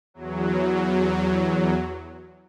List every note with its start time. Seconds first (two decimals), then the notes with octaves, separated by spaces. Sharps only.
0.14 E2 F#3